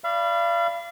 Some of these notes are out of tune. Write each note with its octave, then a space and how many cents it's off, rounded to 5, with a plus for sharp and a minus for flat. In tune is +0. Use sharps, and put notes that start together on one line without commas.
D5 +0 F5 -35 B5 +0